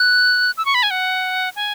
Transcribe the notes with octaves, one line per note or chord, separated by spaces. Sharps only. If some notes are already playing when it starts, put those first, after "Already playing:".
Already playing: F#6
E6
C#6
B5
G#5
F#5
G#5